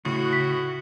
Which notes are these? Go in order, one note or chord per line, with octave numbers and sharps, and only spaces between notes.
C#2 A2 C#3 F#4
B6